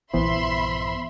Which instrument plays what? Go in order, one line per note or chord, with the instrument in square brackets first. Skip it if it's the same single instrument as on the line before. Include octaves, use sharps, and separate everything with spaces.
[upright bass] A#1 G2 [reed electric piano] E3 B3 C5 [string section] E5 B5 C6